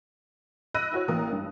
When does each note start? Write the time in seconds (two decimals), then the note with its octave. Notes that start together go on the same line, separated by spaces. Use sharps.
0.74 D#5 B5 E6 F#6 A#6 D#7
0.92 E4 F#4 C#5
1.08 A1 A#3 A#4 D#6
1.32 G2